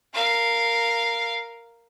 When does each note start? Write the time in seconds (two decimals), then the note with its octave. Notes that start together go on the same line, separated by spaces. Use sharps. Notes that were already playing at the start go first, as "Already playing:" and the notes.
0.13 A#4 F5